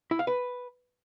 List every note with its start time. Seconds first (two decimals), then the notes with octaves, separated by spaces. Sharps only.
0.11 E4
0.19 F5
0.27 B4